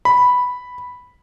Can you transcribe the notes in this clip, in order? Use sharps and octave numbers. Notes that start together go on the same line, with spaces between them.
B5